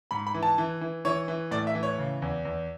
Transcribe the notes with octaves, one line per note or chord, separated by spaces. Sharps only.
G#2 B5
B5
E3
A5
E3
E3
E3 C#5
E3
A2 D5
E5
E3
C#5
C#3
E2
E2